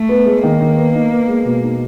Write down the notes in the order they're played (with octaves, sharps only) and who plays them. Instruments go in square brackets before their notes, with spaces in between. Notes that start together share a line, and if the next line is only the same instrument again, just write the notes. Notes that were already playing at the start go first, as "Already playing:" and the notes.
Already playing: [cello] A3
[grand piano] B3
G#3
[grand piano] D#3 [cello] A#3
[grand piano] D#3
B3
D#4
B3
G#3
B2
D#4